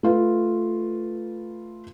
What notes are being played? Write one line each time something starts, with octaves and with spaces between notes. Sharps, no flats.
A3 F4 B4